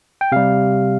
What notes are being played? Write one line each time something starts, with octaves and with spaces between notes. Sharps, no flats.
G5
C3 G3 F5